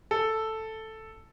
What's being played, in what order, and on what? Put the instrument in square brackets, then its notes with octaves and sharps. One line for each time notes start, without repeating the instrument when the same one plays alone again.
[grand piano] A4